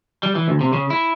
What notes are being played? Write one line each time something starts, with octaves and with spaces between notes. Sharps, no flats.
G3
E3
D2
C3
C#3
E4